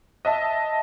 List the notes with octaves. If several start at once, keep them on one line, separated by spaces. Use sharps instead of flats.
D#5 E5 A5